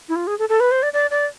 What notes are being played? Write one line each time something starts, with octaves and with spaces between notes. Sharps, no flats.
E4
F4
G#4
A4
A4
B4
C5
D5
D5
D5